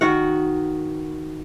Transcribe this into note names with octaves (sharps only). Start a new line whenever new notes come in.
D#3 F#4 F#5